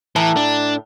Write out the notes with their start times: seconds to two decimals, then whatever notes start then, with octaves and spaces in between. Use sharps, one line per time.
0.16 A2 E3 A5 A#5
0.36 D4